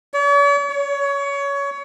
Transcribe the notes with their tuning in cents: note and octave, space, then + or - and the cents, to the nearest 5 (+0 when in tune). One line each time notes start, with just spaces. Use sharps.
C#5 +45
C#5 +20